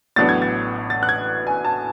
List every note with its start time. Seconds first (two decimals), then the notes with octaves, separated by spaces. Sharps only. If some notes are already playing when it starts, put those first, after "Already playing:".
0.16 A1 A2 F#3 B3 D4 A6
0.29 G#6
0.42 A6
0.90 A6
1.03 F#6
1.09 G#6
1.47 G#5
1.65 A5